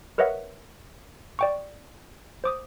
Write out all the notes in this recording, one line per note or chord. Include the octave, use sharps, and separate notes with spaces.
A#4 B4 C#5 D#5 E5 F#5
D5 G5 C#6
C5 D6 D#6